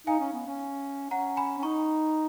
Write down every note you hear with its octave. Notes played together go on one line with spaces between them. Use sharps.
D#4 F5 G#5
C#4
B3
C#4
C#4 F#5 A#5
G#5 B5
C#4
D#4 A#5 C#6